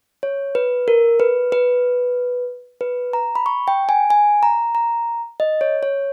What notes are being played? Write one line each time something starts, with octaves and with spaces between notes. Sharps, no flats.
C#5
B4
A#4
B4
B4
B4
A#5
B5
C#6
G5
G#5
G#5
A#5
A#5
D#5
C#5
C#5